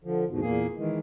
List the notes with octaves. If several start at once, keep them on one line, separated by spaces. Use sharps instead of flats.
D3 F3
E2 G#2 B2
E2 A#2 A#3 G#4
D#3 E3 G#3